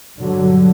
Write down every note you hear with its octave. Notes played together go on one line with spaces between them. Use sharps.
G2 D3 F#3